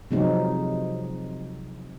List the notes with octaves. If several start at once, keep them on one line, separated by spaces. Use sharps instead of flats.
C3 F3 F#3 G#3 C4 D#4